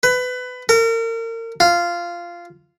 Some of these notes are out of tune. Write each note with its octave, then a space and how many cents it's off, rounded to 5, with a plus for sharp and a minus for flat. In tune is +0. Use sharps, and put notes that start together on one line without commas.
B4 +20
A#4 -35
F4 -10